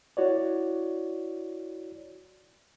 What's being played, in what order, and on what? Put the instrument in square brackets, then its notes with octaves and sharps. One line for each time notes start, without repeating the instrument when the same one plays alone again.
[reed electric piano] E4 F#4 C#5 D5